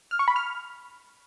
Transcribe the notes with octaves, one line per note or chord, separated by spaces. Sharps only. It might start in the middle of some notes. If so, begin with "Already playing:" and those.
F6
C#6
B5
F6